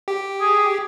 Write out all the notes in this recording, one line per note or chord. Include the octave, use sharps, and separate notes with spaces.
G4
G#4